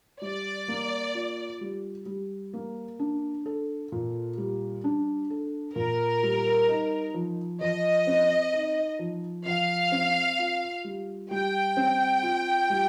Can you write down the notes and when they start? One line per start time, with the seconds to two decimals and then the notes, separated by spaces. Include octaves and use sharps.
0.22 G3 D5
0.68 A#3
1.15 F4
1.61 G3
2.06 G3
2.53 A#3
2.99 D4
3.46 A4
3.92 A#2
4.38 G3
4.84 D4
5.30 A4
5.76 A#2 A#4
6.23 G3
6.69 D#4
7.14 F3
7.61 F3 D#5
8.07 C4
8.53 D#4
8.99 F3
9.46 F3 F5
9.92 C4
10.39 F4
10.84 G3
11.31 G3 G5
11.77 C4
12.23 F4
12.70 G3